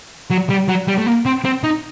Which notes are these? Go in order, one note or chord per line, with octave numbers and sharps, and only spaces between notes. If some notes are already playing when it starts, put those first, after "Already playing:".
F#3
G3
F#3
G3
A3
A#3
C4
C4
D#4